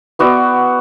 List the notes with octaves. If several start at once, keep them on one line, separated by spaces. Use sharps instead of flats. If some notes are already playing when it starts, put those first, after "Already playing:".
B3 F#4 D5 E5